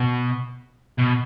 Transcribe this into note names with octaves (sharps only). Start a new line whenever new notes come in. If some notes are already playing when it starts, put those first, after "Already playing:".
Already playing: B2
B2